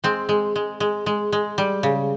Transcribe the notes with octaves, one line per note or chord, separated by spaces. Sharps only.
G#3 C4
G#3
G#3
G#3
G#3
G#3
G3
C#3